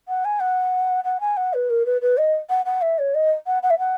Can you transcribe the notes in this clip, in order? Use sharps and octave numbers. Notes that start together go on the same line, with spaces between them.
F#5
G#5
F#5
F#5
G#5
F#5
B4
A#4
B4
B4
D#5
F#5
F#5
E5
C#5
D#5
F#5
F#5
E5
F#5